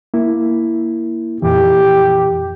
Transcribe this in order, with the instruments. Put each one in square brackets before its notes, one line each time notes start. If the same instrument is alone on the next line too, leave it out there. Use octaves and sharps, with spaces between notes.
[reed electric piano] A#3 E4
[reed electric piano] F2 A#2 E3 [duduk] G4